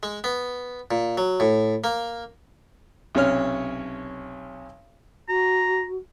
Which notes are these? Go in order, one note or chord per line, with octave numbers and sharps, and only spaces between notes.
G#3
B3
A#2
F#3
A2
A#3
B1 C3 C#4 C#5 F6
F#4 A#5